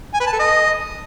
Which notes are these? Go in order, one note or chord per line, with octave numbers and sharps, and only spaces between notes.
G#5
B4
A5
A4
D#5